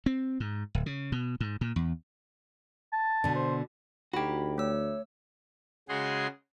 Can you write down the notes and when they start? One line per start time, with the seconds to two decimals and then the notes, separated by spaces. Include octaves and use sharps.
0.06 C4
0.40 G#2
0.75 D1
0.86 C#3
1.12 B2
1.40 G#2
1.61 A#2
1.76 E2
2.93 A5
3.24 B2 D3
3.36 C5
4.13 D2 D#4 F#4 G4 B5
4.58 A3 C#5 E6
5.89 C#3 G#3 F#4 G#4 C6